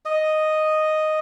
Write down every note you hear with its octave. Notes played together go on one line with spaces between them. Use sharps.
D#5